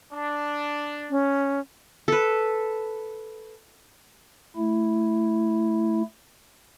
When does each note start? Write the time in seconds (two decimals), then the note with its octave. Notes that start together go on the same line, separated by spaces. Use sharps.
0.13 D4
1.10 C#4
2.08 A4 B4
4.56 A3 E4